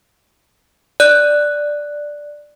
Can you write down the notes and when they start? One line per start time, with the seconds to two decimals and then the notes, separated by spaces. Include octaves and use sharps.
1.00 D5 F#6